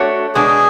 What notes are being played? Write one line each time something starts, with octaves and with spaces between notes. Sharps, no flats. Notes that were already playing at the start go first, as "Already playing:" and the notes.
Already playing: A3 D4 F#4 C#5
B2 G#3 D4 G#4